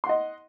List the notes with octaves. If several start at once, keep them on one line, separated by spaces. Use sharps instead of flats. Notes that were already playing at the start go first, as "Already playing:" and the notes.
D#5 F#5 C6